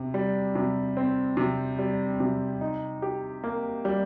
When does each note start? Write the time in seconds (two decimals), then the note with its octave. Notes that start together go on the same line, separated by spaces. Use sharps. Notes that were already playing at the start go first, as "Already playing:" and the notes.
Already playing: C3
0.14 G3
0.55 C3
0.97 C4
1.37 C3
1.79 G3
2.20 C3
2.61 D#4
3.02 G4
3.44 A#3
3.85 G3